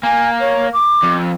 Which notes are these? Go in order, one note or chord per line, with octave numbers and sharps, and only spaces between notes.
A#3 G#5
C#5
D6
F2